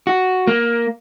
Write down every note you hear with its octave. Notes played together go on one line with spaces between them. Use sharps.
F#4
A#3